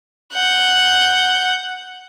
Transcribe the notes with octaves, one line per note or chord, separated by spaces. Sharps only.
F#5 G6